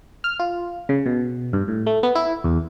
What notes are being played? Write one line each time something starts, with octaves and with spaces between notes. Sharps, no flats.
F6
F4
C#3
B2
G2
A2
A3
B3
E4
E2